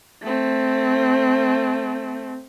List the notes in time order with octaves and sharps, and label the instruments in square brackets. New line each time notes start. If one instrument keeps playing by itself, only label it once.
[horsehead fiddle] A3 C4